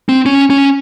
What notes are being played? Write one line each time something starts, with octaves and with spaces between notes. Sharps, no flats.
C4
C#4
C#4